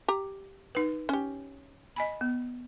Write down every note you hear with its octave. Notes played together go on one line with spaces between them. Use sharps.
G4 A#5
D#4 B4
C#4 G4
D#5 G#5 B5
B3